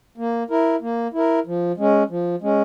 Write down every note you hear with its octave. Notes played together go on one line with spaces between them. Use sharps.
A#3
E4 A#4
A#3
E4 A#4
F3
G#3 C#4
F3
G#3 C#4